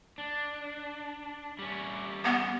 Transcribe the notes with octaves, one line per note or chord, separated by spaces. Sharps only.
D4
G3 C#4
B3